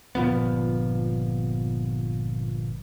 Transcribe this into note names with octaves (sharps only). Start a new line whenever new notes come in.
G1 A#2 F3 B3